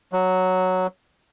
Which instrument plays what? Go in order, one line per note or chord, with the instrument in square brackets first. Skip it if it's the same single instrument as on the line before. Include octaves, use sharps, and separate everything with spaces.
[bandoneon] F#3